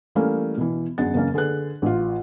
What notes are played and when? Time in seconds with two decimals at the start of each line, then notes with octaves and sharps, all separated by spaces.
0.15 E3 G3 A3 A#3 C#4
0.57 B2 E3
0.98 G1 F#2 G#4 F#5 A6
1.14 F#1 E2 A#3 C#4
1.34 D3 G#4 B4 F#6
1.82 A1 F4